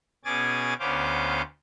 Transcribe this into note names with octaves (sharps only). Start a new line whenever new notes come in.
B2 C#4 G#4 G#5 D6 A6
D2 B3 C#4 C5 F5 D6